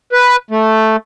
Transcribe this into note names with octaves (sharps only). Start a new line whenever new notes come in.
B4
A3